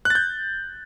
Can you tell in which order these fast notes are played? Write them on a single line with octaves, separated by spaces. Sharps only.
F#6 A6 G6